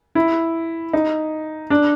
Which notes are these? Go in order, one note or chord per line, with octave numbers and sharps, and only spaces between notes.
E4
D#4
D4